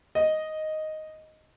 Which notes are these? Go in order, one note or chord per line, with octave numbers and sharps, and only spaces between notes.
D#5